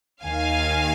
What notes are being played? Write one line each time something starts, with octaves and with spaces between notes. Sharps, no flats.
D#2 D#3 F5 G#5